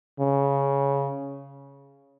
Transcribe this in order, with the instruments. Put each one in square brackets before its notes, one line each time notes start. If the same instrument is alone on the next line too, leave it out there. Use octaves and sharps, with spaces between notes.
[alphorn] C#3